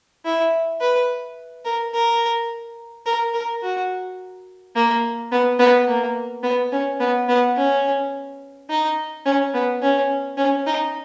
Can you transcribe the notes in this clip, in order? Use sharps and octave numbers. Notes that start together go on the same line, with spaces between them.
E4
B4
A#4
A#4
A#4
A#4
F#4
A#3
B3
B3
A#3
B3
C#4
B3
B3
C#4
D#4
C#4
B3
C#4
C#4
D#4